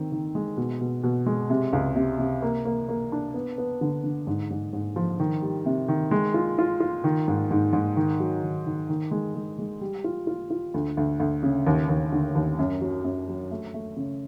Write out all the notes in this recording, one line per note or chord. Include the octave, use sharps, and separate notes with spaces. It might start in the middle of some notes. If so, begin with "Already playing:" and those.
Already playing: D#3 C4
D#3
G#3
B2
B2
B2
G#3
C3
C#2
C3
C3
A#3
A#3
A#3
D4
B3
B3
D3
D3
G#2
G#2
G#2
F3
D#3
G3
C3
D#3
G#3
F4
F4
F4
D#3
G#2
G#2
G#2
D#3
F#3
D#3
D#3
D#3
G#3
G#3
G#3
G3
F4
F4
F4
D2
D2
D2
C#3
D#2
D#2
D3
D#2
F#2
F#3
F#2
F#3
A3
A3
C#3